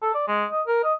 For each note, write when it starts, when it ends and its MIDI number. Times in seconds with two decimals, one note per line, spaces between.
0.02 0.10 69
0.15 0.27 74
0.28 0.45 56
0.51 0.62 75
0.67 0.82 70
0.84 0.93 75